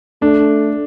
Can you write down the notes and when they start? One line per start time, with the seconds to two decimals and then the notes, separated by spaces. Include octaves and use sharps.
0.22 A3 D4